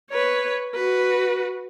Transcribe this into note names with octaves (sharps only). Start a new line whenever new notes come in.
B4 C#5
F#4 B4